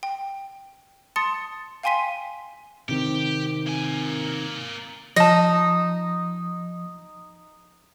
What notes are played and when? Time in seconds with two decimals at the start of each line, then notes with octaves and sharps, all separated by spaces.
0.03 G5
1.16 A5 C6 D#6 A6 C#7
1.83 F5 G5 G#5 C6 B6 D#7
2.89 C3 D#3 C4 G4
3.67 A#3 G#5
5.16 F3 D#4 A5 A#6